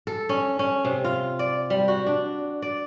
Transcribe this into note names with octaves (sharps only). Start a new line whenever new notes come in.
A4
C#4
C#4
C3
F4
D5
G3
F#4
D4
D5